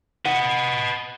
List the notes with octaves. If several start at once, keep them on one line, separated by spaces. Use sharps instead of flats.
B4 D#5 F#5